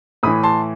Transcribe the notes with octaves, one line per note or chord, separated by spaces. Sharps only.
A2 E3 B5 D#6
A5 C6